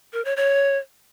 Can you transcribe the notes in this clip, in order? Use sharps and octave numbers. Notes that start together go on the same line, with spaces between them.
A#4
C#5
C#5